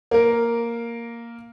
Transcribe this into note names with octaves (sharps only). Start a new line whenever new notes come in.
A#3 A#4